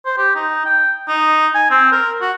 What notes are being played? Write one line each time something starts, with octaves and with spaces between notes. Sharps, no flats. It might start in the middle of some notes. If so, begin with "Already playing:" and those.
C5
G4
D#4
G5
D#4
G#5
C4
A#4
F#4